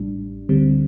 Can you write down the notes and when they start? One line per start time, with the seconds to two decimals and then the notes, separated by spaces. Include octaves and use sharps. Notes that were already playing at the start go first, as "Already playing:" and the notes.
Already playing: A1 A2 G3 D4
0.49 D2 D3 G3 C4